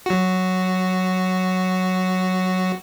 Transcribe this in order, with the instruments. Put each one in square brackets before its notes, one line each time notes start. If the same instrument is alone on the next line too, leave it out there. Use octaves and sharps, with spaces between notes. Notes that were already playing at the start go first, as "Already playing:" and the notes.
[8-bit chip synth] F#3 F#4